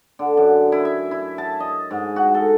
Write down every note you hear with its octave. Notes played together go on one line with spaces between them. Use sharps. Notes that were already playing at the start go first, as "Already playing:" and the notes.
D3
F#2
E4
E5
E4
A5
D#5
G#2
F#4
A4